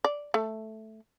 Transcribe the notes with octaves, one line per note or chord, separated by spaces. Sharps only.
D5
A3